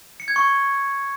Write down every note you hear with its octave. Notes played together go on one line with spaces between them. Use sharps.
C#7
G#6
C#6